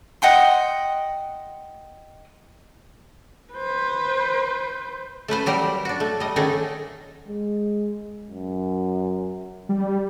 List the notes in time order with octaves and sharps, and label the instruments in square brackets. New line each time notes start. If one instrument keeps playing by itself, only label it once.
[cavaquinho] D#5 F#5 G5 C6
[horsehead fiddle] B4 C5
[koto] A3 C#4 B4 C5
F#3 G3 G4 A#4 C5
D4 F#4
A3
G3 D#5
D3 D#3 A3 C#4 D#4 G#4
[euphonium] G#3
F#2
[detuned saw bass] G3